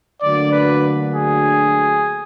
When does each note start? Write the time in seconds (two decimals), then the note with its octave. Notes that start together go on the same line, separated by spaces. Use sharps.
0.21 D2 D3 F#3 A#3 D5
0.52 B4
1.14 G#4